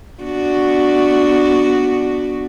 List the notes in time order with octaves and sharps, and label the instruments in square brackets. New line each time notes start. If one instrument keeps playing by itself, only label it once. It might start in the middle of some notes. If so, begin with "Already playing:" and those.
[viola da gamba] B3 D4 F#4